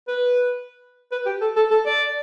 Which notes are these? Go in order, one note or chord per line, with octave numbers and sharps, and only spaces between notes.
B4
B4
G4
A4
A4
A4
D5